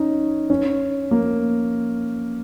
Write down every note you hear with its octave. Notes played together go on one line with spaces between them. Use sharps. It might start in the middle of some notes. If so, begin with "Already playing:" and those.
Already playing: C#4 D#4
C#4
A#3